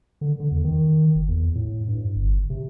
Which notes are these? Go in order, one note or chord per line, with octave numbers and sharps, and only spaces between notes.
D3
D3
E2
D#3
F#1
E2
A2
G2
G1
C3